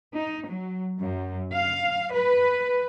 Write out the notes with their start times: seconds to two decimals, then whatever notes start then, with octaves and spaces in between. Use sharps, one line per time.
0.16 D#4
0.48 F#3
0.99 F#2
1.55 F5
2.13 B4